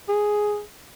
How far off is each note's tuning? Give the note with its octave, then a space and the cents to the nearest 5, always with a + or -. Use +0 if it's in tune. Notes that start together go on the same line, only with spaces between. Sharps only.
G#4 +5